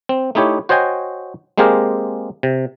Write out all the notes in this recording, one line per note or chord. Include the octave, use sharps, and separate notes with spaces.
C4
A3 D#4 E4 G4 C#5
F#4 C5 C#5 D#5 G5 G#5
G#3 A#3 C4 G4 G#4 A#4
C3